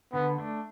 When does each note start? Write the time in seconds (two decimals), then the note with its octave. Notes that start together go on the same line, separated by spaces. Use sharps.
0.13 D3 B3
0.38 A3 D4